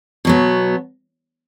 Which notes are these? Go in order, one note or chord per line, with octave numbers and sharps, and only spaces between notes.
B2 F#3 B3